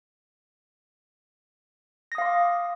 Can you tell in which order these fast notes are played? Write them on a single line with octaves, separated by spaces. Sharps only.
A#6 D#6 F5 C6 D6